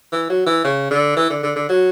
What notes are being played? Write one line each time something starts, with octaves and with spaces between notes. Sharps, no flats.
E3
F#3
E3
C#3
D3
E3
D3
D3
D3
F#3